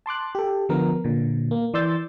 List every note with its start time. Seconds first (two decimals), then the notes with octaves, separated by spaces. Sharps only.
0.06 A5 C6 D6 F#6
0.35 G4 A4
0.69 D3 F3 B3 A#4
1.04 A#2 D3
1.51 A#3
1.74 E3 D5 C6 E6 G6 A6